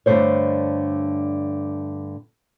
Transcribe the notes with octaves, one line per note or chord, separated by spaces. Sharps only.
G2 D3 D#3 A3 C5 C#5